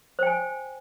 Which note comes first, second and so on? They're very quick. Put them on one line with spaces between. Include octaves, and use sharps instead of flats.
C5 G5 G#5